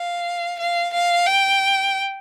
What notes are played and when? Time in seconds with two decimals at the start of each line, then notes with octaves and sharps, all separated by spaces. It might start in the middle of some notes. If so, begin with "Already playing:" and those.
Already playing: F5
0.59 F5
0.93 F5
1.27 G5